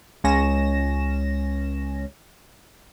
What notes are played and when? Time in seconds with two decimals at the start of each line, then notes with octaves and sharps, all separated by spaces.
0.24 C#2 C#4 A#6 E7